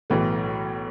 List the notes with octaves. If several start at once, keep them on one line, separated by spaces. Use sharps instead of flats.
B1 A2 E3 A3